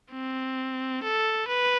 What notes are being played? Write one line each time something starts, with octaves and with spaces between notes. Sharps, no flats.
C4
A4
B4